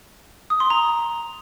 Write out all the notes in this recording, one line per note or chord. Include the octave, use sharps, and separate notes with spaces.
D#6
C6
A#5